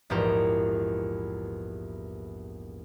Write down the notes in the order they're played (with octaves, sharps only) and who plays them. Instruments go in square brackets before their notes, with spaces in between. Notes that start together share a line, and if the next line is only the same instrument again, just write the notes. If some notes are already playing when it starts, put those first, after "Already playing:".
[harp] A#1 E2 G#2 G4 A#5